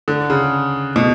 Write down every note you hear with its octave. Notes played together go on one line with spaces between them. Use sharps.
D3
C#3
B2